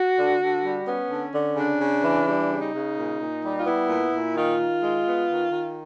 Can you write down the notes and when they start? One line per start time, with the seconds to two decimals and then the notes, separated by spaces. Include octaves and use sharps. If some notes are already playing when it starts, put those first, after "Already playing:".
Already playing: F#4
0.17 D3
0.41 D3
0.63 G3
0.86 B3 C#4
1.10 D3
1.34 D3
1.56 C#3 D4
1.80 C#3
2.03 E3
2.26 G3 D4
2.50 C#3
2.61 D#4
2.73 C#3
2.96 A#2
3.19 A#2
3.43 G3
3.57 F4
3.66 B3 E4
3.89 A#2
4.13 A#2
4.35 D#3 F4
4.59 D#3
4.82 G#3
5.06 B3
5.29 D#3
5.52 D#3